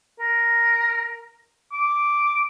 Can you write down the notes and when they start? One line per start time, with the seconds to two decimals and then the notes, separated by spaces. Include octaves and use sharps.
0.20 A#4
1.72 D6